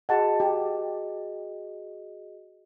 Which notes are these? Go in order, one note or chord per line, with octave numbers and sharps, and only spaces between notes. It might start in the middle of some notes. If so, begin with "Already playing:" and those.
F#4 G#4 D#5 F#5 A5
G4